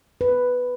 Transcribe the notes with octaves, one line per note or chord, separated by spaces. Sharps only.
B4